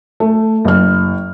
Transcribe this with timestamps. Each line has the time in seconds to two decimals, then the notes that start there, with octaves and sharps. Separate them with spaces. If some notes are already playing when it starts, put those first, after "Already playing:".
0.20 A3
0.65 F#1 F6